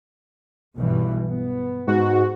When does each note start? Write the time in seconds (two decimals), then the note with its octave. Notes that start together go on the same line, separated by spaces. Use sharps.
0.76 B1 G2 E3
1.27 B3
1.87 G#2 F#4